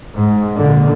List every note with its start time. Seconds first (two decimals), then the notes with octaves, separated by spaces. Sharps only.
0.15 G#2
0.57 A#2 D3